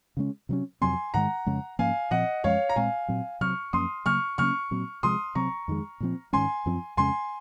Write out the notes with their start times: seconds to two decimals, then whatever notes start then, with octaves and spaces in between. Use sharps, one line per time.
0.17 C#3 G#3 C#4
0.49 C3 F#3 C#4
0.81 F2 C3 F#3 C4 G#5 C6
1.14 G#2 D#3 G#3 F#5 A#5
1.46 F2 C#3 G#3 C#4
1.79 G#2 F3 A#3 C#4 F5 G#5
2.11 A#2 F3 C4 D#5 F#5
2.44 F#2 F3 G#3 C#4 C#5 F5
2.69 A#5
2.76 A#2 G#3 C4 F5 G#5
3.08 A#2 F#3 C4
3.41 C3 F#3 C4 C#6 F6
3.73 F#2 F3 A#3 C#4 C6 D#6
4.06 C#3 F#3 A#3 C#6 F6
4.38 C#3 F#3 A#3 C#4 C#6 F6
4.71 A#2 F#3 C4
5.03 C3 F3 G#3 C6 D#6
5.35 C3 F#3 C4 A#5 C#6
5.68 F2 D#3 G#3
6.00 A#2 F3 C4
6.33 G#2 D#3 G#3 C#4 G#5 C6
6.66 F#2 F3 C4
6.97 F2 C#3 G#3 C#4 G#5 C6